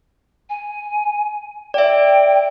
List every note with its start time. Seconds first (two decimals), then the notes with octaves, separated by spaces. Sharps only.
0.50 G#5
1.74 D5 E5 G5